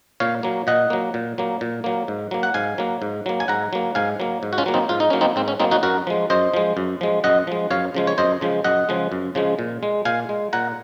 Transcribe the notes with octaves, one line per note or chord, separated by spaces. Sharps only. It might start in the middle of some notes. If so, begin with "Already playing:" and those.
A#2 C#5 F5
F#3 A#3
A#2 D#5 F#5
F#3 A#3
A#2
F#3 A#3
A#2
F#3 A#3
G#2
F#3 A#3
F#5
G#2 F5 G#5
F#3 A#3
G#2
F#3 A#3
G#5
G#2 F#5 A#5
F#3 A#3
G#2 F5 G#5
F#3 A#3
G#2
F#4
C#4 F4
F#3 A#3
C4 D#4
G#2 F4
D#4
F#3 A#3 C#4
C4 D#4
G#2 C4
C#4
F#3 A#3 C4 D#4
D#4 F#4
F#2 F#4 A#4
F3 G#3
F#2 C5 D#5
F3 G#3
F#2
F3 G#3
F#2 D#5 F#5
F3 G#3
F#2 C#5 F5
C#3 F3 G#3
C#5
F#2 C5 D#5
C#3 F3 G#3
F#2 D#5 F#5
C#3 F3 G#3
F#2
C#3 F3 G#3
A#2
G#3
A#2 F5 G#5
G#3
A#2 F#5 A#5